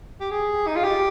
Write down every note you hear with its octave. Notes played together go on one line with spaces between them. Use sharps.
G4
G#4
D#4
F4
G4